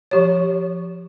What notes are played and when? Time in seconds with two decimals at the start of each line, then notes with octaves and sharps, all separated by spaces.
0.11 F3 G4 C#5